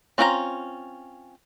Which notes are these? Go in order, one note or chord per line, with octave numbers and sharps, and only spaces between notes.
C4 C#4 F4 A#4 A#5